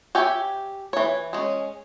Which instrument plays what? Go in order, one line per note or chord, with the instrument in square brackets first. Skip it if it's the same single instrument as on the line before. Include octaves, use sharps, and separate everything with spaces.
[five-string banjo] G4 C#5 E5 G5 G#5
E3 C#5
G#3 C#4